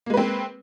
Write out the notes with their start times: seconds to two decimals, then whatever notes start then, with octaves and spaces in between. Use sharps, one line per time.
0.06 A#3
0.10 G#3
0.14 B4
0.17 C4